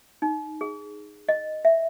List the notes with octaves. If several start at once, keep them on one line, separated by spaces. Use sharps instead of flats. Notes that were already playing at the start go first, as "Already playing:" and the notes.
D#4
G#4
D#5
E5